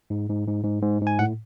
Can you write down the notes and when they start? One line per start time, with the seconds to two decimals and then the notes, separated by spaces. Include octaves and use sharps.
0.10 G#2
0.29 G#2
0.47 G#2
0.64 G#2
0.82 G#2
1.01 G#2
1.07 G#5
1.19 A2 F#5